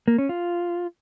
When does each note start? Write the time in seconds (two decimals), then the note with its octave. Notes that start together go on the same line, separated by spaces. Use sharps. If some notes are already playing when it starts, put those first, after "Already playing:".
0.08 A#3
0.18 C#4
0.29 F4